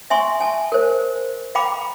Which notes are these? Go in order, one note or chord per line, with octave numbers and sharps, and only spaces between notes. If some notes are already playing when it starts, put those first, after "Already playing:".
E5 G#5 C6 C#6
G#5 A5
A#4 C5
F5 G5 A#5 B5 D6